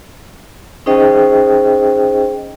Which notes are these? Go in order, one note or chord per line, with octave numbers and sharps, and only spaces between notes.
C#4 D#4 G#4 C5 D#5 G5